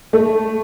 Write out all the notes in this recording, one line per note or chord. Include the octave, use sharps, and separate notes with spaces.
A3